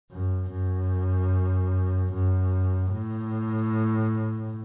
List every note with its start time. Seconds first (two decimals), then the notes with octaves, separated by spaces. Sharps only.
0.12 F#2
0.51 F#2
2.12 F#2
2.92 A2